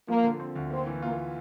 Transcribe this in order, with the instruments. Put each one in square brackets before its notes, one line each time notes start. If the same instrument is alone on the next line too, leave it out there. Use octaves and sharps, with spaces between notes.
[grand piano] F3 [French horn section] A#3
[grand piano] D3
C4
D2
[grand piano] A#3 [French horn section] C4
[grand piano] E3
[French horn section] A#3 [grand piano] F4